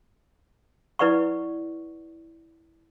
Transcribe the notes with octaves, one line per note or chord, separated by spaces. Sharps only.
E4 B4 D5 F#5 C#6